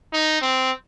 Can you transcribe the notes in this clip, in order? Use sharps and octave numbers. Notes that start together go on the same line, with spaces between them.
D#4
C4